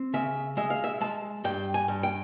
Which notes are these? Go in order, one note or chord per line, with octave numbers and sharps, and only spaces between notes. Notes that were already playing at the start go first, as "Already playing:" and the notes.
Already playing: C4
C#3 E5
G#3 E5
F5
E5
G#3 A5
G2 G5
G#5
G2
G5